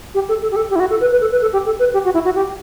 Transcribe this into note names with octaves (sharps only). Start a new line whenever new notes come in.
G4
A4
A4
G4
A4
G4
E4
F#4
A4
B4
B4
A4
B4
A4
G4
A4
B4
G4
F#4
E4
F#4
G4